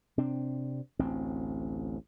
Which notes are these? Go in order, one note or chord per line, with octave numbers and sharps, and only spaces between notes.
C3 C4 D4
A1 D2 C4